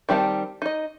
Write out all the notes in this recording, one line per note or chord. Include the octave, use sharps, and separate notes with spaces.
D#3 G3 C4 A5
D#4 D#5